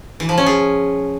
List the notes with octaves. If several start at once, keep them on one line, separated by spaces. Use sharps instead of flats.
E3
F3
C#4
G#4